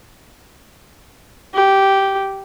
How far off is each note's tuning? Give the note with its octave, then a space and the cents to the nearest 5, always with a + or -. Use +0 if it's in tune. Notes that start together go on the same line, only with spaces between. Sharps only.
G4 -10